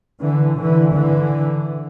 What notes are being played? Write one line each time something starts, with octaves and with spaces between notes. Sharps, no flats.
D3 E3
D3 E3
D3 E3